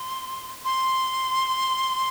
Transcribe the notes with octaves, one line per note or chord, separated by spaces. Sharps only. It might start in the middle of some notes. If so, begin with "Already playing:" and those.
Already playing: C6
C6